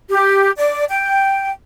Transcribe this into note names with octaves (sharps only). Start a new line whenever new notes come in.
G4
D5
G5